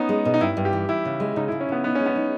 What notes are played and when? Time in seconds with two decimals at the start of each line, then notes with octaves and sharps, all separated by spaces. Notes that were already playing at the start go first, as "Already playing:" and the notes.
Already playing: B3 C#4 D#4
0.09 G#3
0.25 B2
0.34 D#4
0.41 G2 E4
0.57 G2
0.65 G4
0.73 E3
0.89 E3 E4
1.05 C#3
1.20 G#3
1.36 C#3 D#4
1.48 E4
1.52 C#3
1.61 C#4
1.69 C#3 B3
1.84 B3 D#4
1.95 G#3 C#4
2.06 B3
2.16 D#4